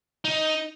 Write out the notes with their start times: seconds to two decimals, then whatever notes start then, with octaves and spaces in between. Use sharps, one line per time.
0.25 D#4